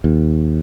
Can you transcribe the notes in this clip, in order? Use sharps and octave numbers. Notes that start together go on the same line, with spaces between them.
D#2